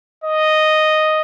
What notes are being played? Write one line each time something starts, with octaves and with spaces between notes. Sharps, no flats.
D#5